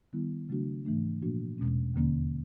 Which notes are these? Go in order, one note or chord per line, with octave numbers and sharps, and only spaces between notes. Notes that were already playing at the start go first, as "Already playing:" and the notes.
D#3 G3 B3 E4
C#3 F#3 A3 D4 F#4
G#2 E3 A3 D4
A#2 F3 A#3 D4 F#4
E2 B2 G#3 C#4
D#2 D3 F3 A#3 C#4